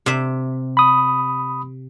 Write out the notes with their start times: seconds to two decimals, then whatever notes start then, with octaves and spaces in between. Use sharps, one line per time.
0.06 C3 E5
0.77 B5 D#6